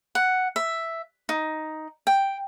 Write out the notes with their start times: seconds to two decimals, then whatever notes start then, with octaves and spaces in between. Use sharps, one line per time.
0.15 F#5
0.56 E5
1.29 D#4
2.07 G5